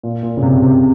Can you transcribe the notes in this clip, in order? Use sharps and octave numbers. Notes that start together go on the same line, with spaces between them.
A#2
A#2
C#3
C3
C3